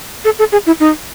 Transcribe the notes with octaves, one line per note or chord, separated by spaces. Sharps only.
A4
A4
G#4
E4
D#4